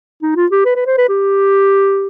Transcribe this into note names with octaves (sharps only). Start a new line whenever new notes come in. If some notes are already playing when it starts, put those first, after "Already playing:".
D#4
F4
G4
B4
B4
C5
B4
G4